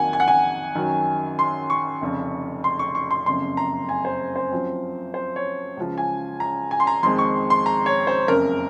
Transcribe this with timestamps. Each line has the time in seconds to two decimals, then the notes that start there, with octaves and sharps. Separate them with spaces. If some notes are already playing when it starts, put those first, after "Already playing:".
Already playing: F2 D#3 F#3 A#3 F#5 G#5
0.13 G#5
0.20 F#5
0.28 G#5
0.75 F#2 D#3 F#3
1.39 C6
1.70 C#6
2.01 F1 F2 C#3
2.64 C6
2.79 C#6
2.95 C#6
3.11 C6
3.26 F#1 F2 C#3 C6
3.57 A#5
3.89 G#5
4.05 C5
4.36 C5
4.51 F#2 F3 C4
5.14 C5
5.36 C#5
5.77 C#2 C#3 F3
5.98 G#5
6.40 A#5
6.71 G#5
6.80 C6
6.87 A#5
7.03 F2 D#3 G#3 C4 C6
7.19 C#6
7.50 C6
7.66 A#5
7.86 C#5
8.07 C5
8.28 F#1 F2 C#3 A#4